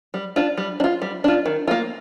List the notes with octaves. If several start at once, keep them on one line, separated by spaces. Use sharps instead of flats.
G3
D4 F4
G3
D4
F4
G3
D4 F4
D#3
A#3 F4